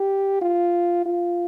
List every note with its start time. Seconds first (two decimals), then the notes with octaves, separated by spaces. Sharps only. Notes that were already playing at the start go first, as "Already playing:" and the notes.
Already playing: G4
0.41 F4
1.06 F4